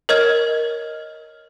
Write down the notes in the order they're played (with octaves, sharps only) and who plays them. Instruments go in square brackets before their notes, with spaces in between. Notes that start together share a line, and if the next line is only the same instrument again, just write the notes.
[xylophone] A#4 C#5 D#5 F6 G#6